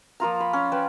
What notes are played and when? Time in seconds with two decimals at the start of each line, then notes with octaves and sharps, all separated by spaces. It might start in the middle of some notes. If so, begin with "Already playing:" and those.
0.20 F3 A#3 F4 A#5
0.40 B5
0.53 C#4
0.72 B4 D5 G5 A5